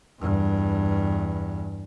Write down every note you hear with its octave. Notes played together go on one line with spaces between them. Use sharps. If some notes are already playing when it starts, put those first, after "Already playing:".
E2 G2